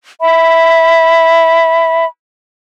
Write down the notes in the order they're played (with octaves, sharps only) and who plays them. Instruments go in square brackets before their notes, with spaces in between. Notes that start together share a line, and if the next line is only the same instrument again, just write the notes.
[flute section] E5 B5